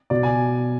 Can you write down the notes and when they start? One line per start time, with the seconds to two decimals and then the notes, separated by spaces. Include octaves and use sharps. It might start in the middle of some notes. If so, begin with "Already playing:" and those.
0.10 B2 D5
0.23 G#5